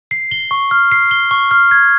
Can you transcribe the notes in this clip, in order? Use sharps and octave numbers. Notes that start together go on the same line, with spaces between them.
C7
G7
C#6
F6
C7
G7
C#6
F6
G#6